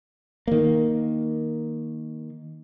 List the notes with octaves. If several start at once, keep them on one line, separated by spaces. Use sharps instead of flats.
D#3 A#3